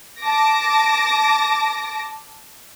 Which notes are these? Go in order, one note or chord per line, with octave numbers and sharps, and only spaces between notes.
A5 D6 A#6